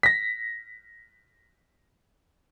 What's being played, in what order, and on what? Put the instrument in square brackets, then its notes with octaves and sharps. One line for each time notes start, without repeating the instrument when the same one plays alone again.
[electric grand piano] A#6 B6